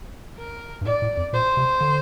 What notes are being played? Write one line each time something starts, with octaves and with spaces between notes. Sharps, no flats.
A#4
G2
A2 D5
A2
F2
A#2 C5
C3
D3